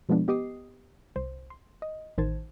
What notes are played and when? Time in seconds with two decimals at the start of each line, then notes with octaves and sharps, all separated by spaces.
0.09 B2 F3 G#3 B3 D4
0.28 B3 G4 D#5 D6 D#6 C7
1.16 C2 C5
1.50 C6
1.82 D#5
2.18 A1 D#3 C5 A5 G#6